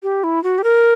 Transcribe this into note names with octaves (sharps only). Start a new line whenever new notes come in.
G4
E4
F#4
G4
A#4